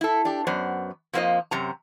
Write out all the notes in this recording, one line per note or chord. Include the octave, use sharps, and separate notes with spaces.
E4 A4
D4 G4
F#2 B3 C5 D5
F2 F3 A#3 F4 C5 D#5
F#2 C3 A#5